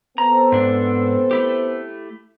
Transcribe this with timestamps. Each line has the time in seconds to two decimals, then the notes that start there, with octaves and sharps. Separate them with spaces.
0.18 B3 C4 A4 A#5
0.52 G#2 D4
1.31 A3 E4 G4